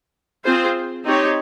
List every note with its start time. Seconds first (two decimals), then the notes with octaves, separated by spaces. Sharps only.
0.45 C4 F4 G#4 C5
1.05 C4 D#4 G4 C#5